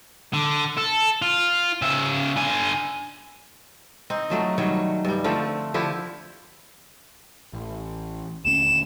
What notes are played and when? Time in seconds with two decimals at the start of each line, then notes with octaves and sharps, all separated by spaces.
0.33 D3
0.77 A4
1.22 F4
1.82 C#3 E5
2.37 D3 G#5
4.10 C4 D#4
4.30 F3 F#3 A3
4.58 D#3 F#3 G3 C#5
5.05 G2 G3
5.24 D3 F3 A3 C4
5.74 D3 F3 E4 G4
7.53 A1
8.45 D#1 D2 C#4 E7